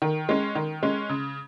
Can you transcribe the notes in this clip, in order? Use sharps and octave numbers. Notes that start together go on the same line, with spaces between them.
D#3
G#3 C#4
D#3
G#3 C#4
C#3